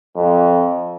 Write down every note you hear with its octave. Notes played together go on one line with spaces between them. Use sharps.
F2